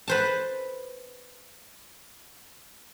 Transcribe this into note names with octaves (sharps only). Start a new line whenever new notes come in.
B4 C5 A5